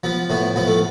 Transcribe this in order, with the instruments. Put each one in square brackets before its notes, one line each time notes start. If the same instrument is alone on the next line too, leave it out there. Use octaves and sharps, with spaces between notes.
[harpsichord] F3 B3
A2 B3
F3 B3
A3